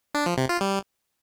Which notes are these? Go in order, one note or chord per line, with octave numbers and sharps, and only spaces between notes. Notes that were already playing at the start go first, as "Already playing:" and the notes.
D4
F3
C3
F4
G3